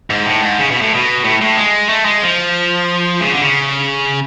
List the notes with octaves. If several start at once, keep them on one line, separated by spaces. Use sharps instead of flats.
G#2
A2
G#2
C#3
B2
A2
B2
A2
A2
G#3
A3
G#3
F3
C#3
D3
C#3